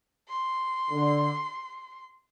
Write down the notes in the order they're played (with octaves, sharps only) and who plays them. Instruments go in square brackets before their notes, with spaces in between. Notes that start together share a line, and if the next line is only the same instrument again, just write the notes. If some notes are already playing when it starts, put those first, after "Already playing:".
[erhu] C6
[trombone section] D3